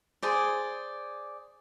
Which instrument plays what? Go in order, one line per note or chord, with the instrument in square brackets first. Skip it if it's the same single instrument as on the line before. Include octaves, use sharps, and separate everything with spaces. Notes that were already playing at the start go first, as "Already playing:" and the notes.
[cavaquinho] G#4 C5 D5